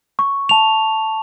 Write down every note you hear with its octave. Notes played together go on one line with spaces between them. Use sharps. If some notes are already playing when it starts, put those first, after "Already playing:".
C#6
A5 F7